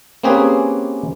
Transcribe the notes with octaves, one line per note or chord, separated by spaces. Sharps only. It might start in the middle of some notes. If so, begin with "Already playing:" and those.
A#3 C4 C#4 G4 G#4 B4